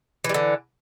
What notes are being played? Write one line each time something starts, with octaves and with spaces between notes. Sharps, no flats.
D3 E3 G3